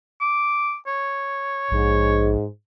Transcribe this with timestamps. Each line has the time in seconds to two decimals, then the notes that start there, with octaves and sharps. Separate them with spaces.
0.21 D6
0.87 C#5
1.71 A#1 G#2